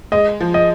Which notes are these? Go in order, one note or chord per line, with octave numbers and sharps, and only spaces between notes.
G#3 D#5
F3
D#5